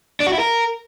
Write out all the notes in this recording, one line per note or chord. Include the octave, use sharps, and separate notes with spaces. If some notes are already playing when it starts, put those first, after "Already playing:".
D4
F#4
E4
A#4